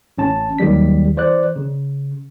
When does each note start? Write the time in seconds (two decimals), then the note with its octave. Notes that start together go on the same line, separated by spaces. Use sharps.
0.18 A1 C#4 A5
0.59 D#2 D#3 F#3 G3 B6
1.17 E3 C5 D5 F#6
1.56 C#3